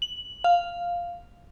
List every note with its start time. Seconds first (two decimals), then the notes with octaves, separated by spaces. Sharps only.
0.02 F#7
0.44 F5